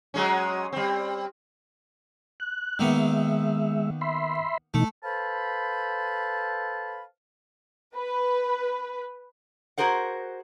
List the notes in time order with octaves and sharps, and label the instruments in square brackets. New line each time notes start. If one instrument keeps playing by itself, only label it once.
[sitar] F#3 G#3 C#4
G3 C4
[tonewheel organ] F#6
[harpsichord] D#3 A#3 B3 [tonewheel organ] G#3 E5
[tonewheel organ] E5 B5 C6
[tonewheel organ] B2 E3 D#4 [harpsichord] A3
[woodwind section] A4 B4 C5 F5 A5 B5
[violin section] B4
[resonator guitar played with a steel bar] F#4 G#4 A#4 C5 F#5